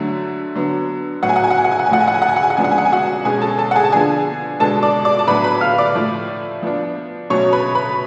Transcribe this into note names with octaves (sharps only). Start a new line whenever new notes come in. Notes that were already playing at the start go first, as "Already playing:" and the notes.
Already playing: D3 F#3 A3
D3 F#3 B3
A2 F#3 B3 F#5
G#5
F#5
G#5
F#5
G#5
F#5
G#5
F#5
G#5
A2 F3 A3 F#5
G#5
F#5
G#5
F#5
G#5
F#5
G#5
F#5
C#3 F3 G#3 B3 D4 G#5
F#5
G#5
F#5
G#5
F#4 F#5
B2 G#3 C#4 G#4 G#5
A4 A5
A4 A5
F#5
G#4 G#5
A5
D3 F3 B3 D4 G#4 G#5
B2 G#3 B3 D4 A4 A5
D5 D6
D5 D6
A5
A2 F#3 B3 D4 B4 B5
B4 B5
F5 F6
D5 D6
A2 F3 A3
F3 B3 D4
B2 F#3 A3 C#4 C#5 C#6
B4 B5
B4 B5